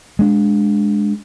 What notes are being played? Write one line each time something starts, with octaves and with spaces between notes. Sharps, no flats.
G#3 D4